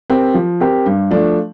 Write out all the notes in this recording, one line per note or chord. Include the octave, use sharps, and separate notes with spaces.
C4 G4 A#4
F3
C4 G4 A#4
G2
F3 A3 D4